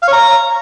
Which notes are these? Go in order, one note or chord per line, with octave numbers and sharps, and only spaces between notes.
F5
C#5
A#5